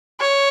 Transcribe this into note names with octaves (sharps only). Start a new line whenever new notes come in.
C#5